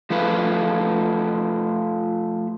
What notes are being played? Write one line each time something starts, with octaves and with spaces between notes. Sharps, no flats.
F3 A3 F4 B4